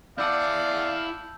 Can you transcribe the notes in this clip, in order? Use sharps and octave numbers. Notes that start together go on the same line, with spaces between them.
E4 D5 F5 F#5 A5 E6 G6